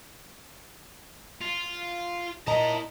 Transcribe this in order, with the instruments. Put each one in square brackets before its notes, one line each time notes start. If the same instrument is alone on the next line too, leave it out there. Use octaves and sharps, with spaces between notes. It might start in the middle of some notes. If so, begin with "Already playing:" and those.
[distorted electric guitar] F4
[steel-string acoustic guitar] A#2 A#5 [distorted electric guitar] E4 A5 [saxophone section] D#5